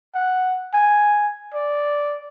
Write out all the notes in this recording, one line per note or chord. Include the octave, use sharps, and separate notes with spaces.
F#5
G#5
D5